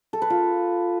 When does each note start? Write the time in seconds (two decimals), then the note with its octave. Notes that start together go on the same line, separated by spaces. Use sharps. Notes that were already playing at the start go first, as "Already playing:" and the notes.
0.13 A4
0.22 B4
0.30 F4